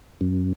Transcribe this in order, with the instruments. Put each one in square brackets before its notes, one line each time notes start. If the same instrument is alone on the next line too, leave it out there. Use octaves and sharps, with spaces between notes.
[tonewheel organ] F#2